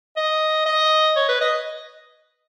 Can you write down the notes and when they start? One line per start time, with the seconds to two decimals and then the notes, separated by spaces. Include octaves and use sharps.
0.17 D#5
0.66 D#5
1.16 C#5
1.28 B4
1.41 D#5